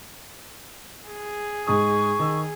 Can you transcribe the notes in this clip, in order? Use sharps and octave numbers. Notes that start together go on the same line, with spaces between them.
G#4
G#2 G#3 C#6 D#6
D#3 E6